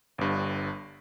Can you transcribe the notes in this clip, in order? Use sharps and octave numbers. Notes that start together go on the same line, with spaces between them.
G1 G2